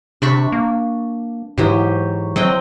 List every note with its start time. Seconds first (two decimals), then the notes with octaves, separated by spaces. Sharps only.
0.22 C3 D4 B5 C#6
0.52 A#3
1.58 G#2 E3 F#3 G4
2.36 F#3 C4 D#5 G5